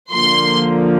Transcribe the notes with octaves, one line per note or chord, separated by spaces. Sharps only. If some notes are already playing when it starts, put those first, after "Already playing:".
D3 F3 A#3 C6